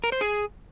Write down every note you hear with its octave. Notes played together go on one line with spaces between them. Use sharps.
A#4
C5
G#4